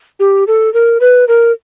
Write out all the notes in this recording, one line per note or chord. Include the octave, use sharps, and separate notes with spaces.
G4
A4
A#4
B4
A#4